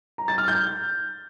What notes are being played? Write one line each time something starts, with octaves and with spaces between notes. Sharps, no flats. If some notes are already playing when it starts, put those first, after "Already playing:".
A#5
A6
F6
G6